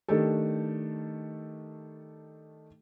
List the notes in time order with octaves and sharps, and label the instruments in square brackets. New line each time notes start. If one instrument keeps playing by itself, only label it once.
[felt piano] D#3 A3 D4 G4 A4